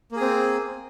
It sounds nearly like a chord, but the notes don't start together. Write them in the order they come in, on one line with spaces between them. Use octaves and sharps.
A#3 G#4 C4